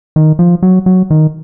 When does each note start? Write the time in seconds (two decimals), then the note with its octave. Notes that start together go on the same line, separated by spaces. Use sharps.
0.16 D#3
0.39 F3
0.63 F#3
0.86 F#3
1.10 D#3